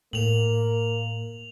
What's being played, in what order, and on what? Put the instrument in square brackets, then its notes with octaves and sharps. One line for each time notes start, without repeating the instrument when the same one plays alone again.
[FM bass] A2 [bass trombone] A#3 [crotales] F7 F#7